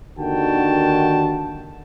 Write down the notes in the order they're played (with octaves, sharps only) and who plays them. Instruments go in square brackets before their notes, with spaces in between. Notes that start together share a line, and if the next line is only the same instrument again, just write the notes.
[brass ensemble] D#2 D3 D#3 F#4 G5 A5